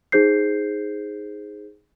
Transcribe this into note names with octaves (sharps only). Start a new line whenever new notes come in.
D#4 G#4 C5 G6 C7